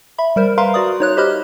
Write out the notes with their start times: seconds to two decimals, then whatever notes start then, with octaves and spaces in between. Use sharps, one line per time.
0.18 E5 B5
0.36 G3 A#4 C5
0.58 A#4 B4 E5 F5 A#5 C6
0.74 F#4 D5 D#6
1.00 D#4 C#5 F#6
1.17 G4 C5 D#5 B5 F6 F#6